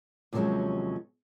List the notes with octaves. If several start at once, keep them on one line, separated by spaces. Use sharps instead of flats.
D#2 C3 F3 F#3 G#3 C#4